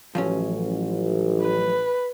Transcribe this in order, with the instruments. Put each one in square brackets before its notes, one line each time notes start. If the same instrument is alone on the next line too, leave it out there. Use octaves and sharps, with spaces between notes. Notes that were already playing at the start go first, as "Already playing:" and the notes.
[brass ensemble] A1 [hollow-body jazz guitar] F3 F#3 C#4
[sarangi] B4